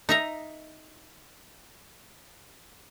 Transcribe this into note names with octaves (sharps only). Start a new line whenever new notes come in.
D#4 E5 A#5